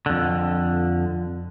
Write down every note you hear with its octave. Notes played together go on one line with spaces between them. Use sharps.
F2 D3